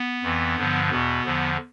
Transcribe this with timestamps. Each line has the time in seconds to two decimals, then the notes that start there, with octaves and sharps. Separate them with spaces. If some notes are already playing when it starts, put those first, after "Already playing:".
Already playing: B3
0.22 F2 E3
0.56 G2 D3 F3
0.89 E2 B2 B3
1.24 E2 D3 F3